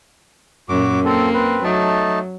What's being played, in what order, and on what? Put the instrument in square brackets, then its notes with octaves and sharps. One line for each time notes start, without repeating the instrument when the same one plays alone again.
[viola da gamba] F#2 A#2 [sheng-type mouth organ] F#4 D6
[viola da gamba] A#3 [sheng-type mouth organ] C4 A4
[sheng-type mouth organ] C4 B4
[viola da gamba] F#3 [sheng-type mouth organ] A3 D#4 A5